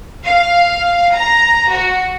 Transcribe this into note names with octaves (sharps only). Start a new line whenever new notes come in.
F5
A#5
F#4